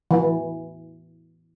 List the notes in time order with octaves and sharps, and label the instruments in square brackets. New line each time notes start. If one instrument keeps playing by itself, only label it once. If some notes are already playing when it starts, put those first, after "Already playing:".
[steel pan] E3